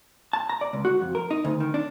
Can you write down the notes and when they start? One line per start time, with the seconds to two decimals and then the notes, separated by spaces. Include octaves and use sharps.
0.33 A5
0.49 A#5
0.61 D5
0.73 C#2
0.85 F#4
1.01 F2
1.15 A#4
1.31 D#4
1.45 D2
1.60 D#3
1.74 D4